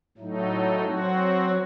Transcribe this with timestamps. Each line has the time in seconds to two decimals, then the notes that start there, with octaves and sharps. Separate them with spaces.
0.17 A2 F#3 A3 D#4
0.85 F#3 C4 F#4